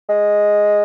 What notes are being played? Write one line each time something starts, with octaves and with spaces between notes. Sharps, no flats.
G#3